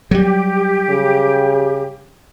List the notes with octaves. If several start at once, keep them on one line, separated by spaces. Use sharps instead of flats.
F#3 G3 G4
C#3